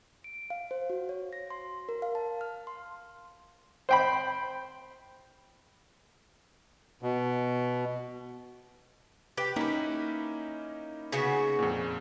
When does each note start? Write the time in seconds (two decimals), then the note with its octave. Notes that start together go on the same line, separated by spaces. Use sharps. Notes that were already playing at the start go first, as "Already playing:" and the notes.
0.24 D7
0.50 F5
0.71 C5
0.90 F#4
1.09 C#5
1.33 A#6
1.50 C6
1.89 A#4
2.02 F5
2.15 A5
2.41 F6
2.67 C6
3.89 C5 G5 B5
7.03 B2
9.37 G4 B4
9.56 A#3 C#4 D#4 E4 B4
11.12 C#3 B3 F#4
11.59 F2 A#2